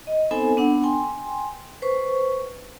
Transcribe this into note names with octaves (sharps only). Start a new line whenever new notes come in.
D#5
B3 C4 D#4 A4 C5 G#5
B3 D4 F#5
G5 G#5 C6
B4 C5 C#6